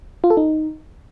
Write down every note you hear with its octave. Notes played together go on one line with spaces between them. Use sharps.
F4
A4
D#4